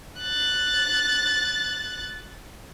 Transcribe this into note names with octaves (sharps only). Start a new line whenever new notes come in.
F#6 A6